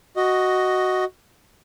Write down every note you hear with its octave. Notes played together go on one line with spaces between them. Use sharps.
F#4 D#5